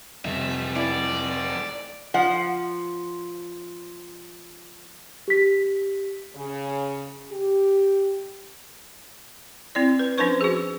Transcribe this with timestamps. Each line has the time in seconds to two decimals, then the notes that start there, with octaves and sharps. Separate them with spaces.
0.25 F2 C3 G3 A3 D#4 E5
0.76 E4 D5
2.14 F3 F#5
5.28 G4 B6
6.35 C#3
7.31 G4
9.75 C4 E4 D5
9.99 B4
10.18 F3 C#4 D4 B4 C5 C#6
10.41 F#4 G#4